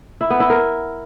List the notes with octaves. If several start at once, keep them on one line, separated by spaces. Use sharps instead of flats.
E4
B3
E4
A#4